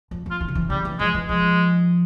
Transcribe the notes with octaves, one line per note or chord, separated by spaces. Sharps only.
F2
F2 F4
E3
C#3
E3
C#3 G3
E3
F3 G#3
E3
F3 G#3